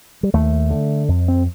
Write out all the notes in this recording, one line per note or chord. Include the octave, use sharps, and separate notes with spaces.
G3
D#2 A3
D3
F2
C4